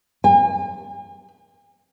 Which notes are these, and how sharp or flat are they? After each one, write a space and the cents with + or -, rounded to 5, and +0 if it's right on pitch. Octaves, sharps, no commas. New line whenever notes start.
G#5 -40